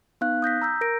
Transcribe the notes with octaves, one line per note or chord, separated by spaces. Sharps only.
B3 D#4 F5 F#6
D#6 G6 A#6 B6
A#5 E6 G6
A#4 A#6 D7